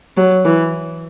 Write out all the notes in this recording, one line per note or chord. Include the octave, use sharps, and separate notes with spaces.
F#3
E3